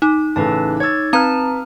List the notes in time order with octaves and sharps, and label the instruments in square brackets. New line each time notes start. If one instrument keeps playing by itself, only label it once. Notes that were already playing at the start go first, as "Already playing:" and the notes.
[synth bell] D#4 [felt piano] D6
[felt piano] A1 C#3 E3 [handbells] A4 B4 A5
[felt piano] C#5 E6 [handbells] G#6 A6
[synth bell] C4 A#5 [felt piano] B4 F6 [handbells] A5